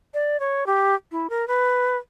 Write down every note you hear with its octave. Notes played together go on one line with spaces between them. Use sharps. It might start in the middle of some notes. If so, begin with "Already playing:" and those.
D5
C#5
G4
E4
A#4
B4